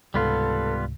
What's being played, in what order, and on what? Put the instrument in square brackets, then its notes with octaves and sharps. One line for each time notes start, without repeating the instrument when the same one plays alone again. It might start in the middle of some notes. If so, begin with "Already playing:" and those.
[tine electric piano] C#2 G#2 C3 [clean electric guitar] G3 B3 F4 [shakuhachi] A4